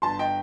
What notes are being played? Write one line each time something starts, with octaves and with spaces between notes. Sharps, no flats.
G1 A5 C6
D#5 G5